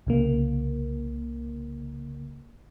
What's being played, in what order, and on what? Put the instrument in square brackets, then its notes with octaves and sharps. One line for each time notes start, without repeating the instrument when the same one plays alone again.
[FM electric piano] C2 C#3 A#3